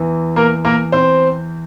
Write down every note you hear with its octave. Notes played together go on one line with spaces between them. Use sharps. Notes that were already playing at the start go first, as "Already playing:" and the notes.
Already playing: E2 E3
A#3 A#4
A#3 A#4
C4 C5